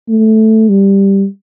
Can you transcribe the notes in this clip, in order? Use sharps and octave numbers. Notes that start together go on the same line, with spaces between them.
A3
G3